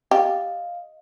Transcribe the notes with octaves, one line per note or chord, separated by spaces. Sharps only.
G4 D#5 F5